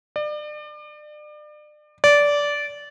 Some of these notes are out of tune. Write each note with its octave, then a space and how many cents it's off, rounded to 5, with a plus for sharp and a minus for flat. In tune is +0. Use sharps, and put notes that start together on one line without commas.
D5 +35
D5 -15